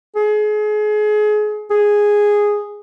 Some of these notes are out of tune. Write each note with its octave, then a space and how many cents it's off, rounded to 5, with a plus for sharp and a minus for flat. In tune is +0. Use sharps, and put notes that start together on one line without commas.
G#4 +30
G#4 -5